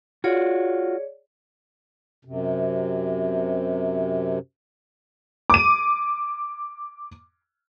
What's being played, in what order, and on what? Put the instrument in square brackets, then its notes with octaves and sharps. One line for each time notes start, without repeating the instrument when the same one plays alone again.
[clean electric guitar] F4 F#4 [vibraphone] G#4 C#5 D5
[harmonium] F#2 C3
[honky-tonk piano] D6 D#7